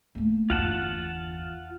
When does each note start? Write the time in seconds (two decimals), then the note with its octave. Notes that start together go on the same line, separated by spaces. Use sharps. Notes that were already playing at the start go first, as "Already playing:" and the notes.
0.15 A3 A#3
0.50 G1 E2 F4 F#5 A5